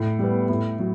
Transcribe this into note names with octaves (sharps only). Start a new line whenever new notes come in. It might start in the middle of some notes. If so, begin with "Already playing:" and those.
Already playing: A2
G3 B3
A2
F#3